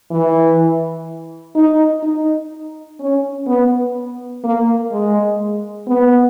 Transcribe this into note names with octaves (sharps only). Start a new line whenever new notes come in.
E3
D#4
D#4
C#4
B3
A#3
G#3
B3